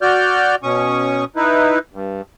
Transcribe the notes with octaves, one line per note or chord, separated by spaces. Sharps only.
F#4 D5 F6 G6
B2 C#4 C#6 D#6
D#4 E4 B4
G2